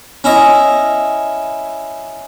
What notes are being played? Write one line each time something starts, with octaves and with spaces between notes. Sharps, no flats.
C#4 E4 D#5